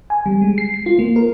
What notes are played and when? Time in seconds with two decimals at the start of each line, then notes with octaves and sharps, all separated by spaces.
0.10 G#5
0.26 G3
0.42 G#3
0.58 C7
0.74 C7
0.86 F4
0.99 A#3
1.16 A#4